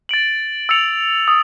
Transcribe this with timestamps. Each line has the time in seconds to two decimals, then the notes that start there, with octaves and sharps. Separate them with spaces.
0.09 A6 D7 F#7
0.69 E6 A6 C#7 F7
1.28 D#6